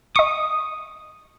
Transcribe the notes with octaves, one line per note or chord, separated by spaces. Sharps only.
D#5 C#6 D#6